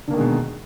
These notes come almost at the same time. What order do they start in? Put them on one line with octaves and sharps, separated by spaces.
D3 A#3 D#3 G#3 B2